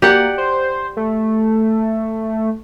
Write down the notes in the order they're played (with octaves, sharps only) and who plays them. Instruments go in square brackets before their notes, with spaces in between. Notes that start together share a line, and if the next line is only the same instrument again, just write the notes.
[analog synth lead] A#3 [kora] G4 D5 F#5
[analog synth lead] C5
A3